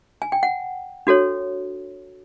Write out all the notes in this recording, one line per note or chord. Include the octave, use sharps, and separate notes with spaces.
G#5
G5
F#5
D4 F#4 A4 C#5